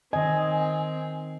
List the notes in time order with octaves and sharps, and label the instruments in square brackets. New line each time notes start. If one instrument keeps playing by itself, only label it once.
[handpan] D#3 D#5 [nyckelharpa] C4 [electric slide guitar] G#5